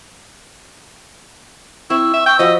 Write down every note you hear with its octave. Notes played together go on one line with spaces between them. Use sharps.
C4 E4 C#6 E6
E5
G5 C#6
F3 F#4 C5 D#5 B5